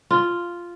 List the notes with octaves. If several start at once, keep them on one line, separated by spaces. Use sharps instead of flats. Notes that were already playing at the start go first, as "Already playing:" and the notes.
F4